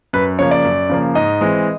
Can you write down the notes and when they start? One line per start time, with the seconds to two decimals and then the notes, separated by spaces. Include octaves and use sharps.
0.13 F#2 B4
0.39 C#3 F3 A#3 C#5
0.51 D5
0.64 F#2
0.89 C#3 F3 A#3
1.15 G#2 D#5
1.41 E3 G#3 C4